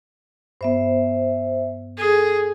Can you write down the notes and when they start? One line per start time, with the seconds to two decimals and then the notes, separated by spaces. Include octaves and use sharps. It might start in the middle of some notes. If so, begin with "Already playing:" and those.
0.61 G2 B3 C5 E5
1.98 G#4 A4